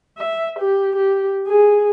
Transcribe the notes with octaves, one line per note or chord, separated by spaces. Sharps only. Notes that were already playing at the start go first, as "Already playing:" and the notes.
E5
G4
G4
G#4